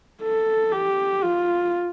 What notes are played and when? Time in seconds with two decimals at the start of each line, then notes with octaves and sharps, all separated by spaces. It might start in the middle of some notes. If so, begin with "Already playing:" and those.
0.22 A4
0.72 G4
1.23 F4